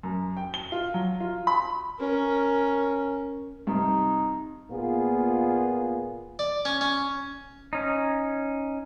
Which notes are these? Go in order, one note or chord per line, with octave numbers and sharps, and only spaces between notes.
F#2
G5
G7
F4
F#3
F4
B5
C#4 A#4
G2 C3 D#4
A#2 A#3 B3 F4 G#4
D5
C#4
C#4
C#4 D#4